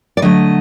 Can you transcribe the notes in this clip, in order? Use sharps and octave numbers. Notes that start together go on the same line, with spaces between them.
D5
D3 F#3 A3 D#5